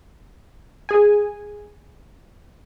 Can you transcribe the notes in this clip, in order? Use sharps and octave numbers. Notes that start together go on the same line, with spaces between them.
G#4 G#5